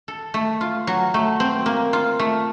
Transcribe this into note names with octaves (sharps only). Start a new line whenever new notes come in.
A4
A3
F4
F#3
A3
C4
A#3
F4
A3